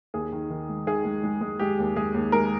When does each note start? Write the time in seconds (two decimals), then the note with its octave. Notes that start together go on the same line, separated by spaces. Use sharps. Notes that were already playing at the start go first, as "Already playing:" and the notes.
0.14 D#2 G#4
0.32 D#3
0.50 D#3
0.69 G#3
0.87 D#3 G#4
1.05 G#3
1.24 G#3
1.41 G#3
1.59 G#3 G4
1.79 D#2
1.96 G#3 G#4
2.14 D#2
2.32 G#3 A#4